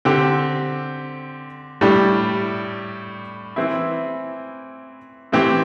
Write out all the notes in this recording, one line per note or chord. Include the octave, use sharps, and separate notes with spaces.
D3 C4 G4
A2 G3 D4 G4
E3 C4 E4
A2 E3 C4 G4